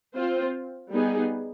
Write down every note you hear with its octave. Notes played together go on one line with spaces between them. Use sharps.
C4 F4 C5
G3 B3 D#4 G#4